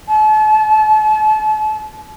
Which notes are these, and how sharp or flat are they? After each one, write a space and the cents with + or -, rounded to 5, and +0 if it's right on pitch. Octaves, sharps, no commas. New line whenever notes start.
A5 -40